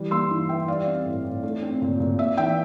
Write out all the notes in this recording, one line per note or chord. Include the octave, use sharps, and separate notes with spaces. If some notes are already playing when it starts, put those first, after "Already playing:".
Already playing: E3 G3
A#3 C6 E6
E3
E3 E5 G5
G3 D5 F5
C4
A2
A2
A3
C4
A#2
A#2
A#3 E5
E3 E5 G5